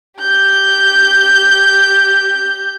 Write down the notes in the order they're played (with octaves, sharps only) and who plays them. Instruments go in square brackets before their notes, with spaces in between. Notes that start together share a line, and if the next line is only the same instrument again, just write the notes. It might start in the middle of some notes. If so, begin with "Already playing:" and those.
[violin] G4 G6